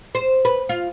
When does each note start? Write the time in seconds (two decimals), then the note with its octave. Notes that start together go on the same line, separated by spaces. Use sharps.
0.15 C5
0.45 B4
0.69 F4